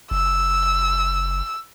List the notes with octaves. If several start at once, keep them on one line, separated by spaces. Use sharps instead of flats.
F#1 E6